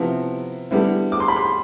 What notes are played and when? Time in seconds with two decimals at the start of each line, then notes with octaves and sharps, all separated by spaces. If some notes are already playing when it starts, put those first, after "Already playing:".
Already playing: C3 F3 B3 E4
0.71 D3 G3 B3 E4
1.12 D6
1.20 C6
1.28 B5
1.36 C6